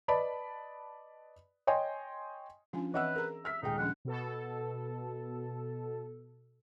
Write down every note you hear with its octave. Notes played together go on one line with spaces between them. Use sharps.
B4 D5 D#5 A5 B5
C#5 D#5 G5 G#5 C6
F3 C#4 D4 G#5
E3 C4 B4 D#5 E5 F#5 E6
G#4 A#4 A#5
E5 F6 B6
D#1 G#3 D#4 G5
F3 C#4 D4 F#5
B2 A4